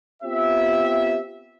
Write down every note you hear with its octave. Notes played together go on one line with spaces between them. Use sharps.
B3 C4 F4 G4 E5